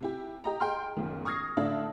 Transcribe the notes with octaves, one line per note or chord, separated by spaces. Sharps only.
C3 E4 G4
G4 D#5 A#5
G#4 G5 C6 F6
F#1 B1 D#3
C#6 D#6 F6 G#6 A#6 C7
A2 D3 D4 E5 F5 A5